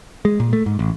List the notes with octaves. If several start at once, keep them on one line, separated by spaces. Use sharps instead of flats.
G#3
A#2
A3
G#2
A1